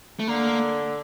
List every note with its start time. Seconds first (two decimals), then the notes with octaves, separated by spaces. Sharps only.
0.20 A3
0.28 D3 A#3